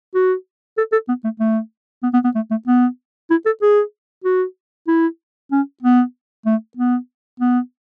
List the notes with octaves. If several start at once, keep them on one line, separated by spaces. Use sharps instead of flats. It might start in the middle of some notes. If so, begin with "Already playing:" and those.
F#4
A4
A4
B3
A3
A3
B3
B3
B3
A3
A3
B3
E4
A4
G#4
F#4
E4
C#4
B3
A3
B3
B3